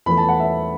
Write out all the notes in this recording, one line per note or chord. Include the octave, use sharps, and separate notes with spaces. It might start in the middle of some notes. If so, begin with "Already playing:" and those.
E2 E3 A3 B5
A5
F#5
E5